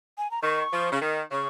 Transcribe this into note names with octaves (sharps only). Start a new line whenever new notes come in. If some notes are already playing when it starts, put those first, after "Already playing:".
G#5
A#5
D#3 C#6
F3
C#3
D#3
C#3 C#6